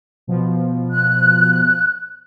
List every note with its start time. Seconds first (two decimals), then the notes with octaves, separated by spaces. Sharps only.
0.27 B2 F3
0.92 F#6